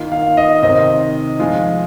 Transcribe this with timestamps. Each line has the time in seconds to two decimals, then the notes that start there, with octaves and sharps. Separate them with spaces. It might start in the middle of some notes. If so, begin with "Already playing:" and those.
Already playing: D#3 A#3 F4
0.12 F5
0.37 D#5
0.62 C3 D#3 C4 D#5
1.39 F3 G#3 F4